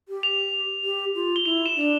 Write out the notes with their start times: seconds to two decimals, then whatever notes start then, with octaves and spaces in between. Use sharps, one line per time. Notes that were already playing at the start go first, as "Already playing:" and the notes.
0.09 G4
0.23 F7
0.84 G4
1.15 F4
1.36 G7
1.45 E4 F7
1.66 E7
1.76 D4
1.81 E7